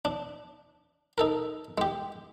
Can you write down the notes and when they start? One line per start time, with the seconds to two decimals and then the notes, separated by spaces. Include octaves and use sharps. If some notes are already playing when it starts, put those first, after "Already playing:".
0.05 D4
1.18 D#4 A4 A#4
1.78 G#3 G4